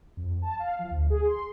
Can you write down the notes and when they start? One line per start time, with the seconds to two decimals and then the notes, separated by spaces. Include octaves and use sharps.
0.17 F2
0.42 A5
0.60 F5
0.79 F3
0.91 D2
1.10 G#4
1.24 C6